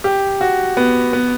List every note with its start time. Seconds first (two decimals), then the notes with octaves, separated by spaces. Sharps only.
0.04 G4
0.41 F#4
0.77 B3
1.13 B3